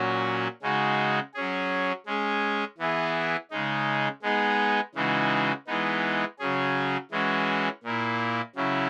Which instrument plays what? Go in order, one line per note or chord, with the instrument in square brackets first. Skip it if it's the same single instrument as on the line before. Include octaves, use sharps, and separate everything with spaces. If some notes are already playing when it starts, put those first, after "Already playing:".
Already playing: [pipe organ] A#2 F#3 C#4 F#4
C#3 G#3 D#4 F#4
F#3 C#4 G#4
G#3 C#4 G#4
E3 B3 E4 G#4
C#3 G#3 D#4
G#3 B3 D#4 G#4
C#3 E3 G#3 D#4 F#4
E3 G#3 B3 D#4
C#3 F#3 C#4 G#4
E3 G#3 C#4 F#4
A#2 A#3 E4
C#3 F#3 C#4 E4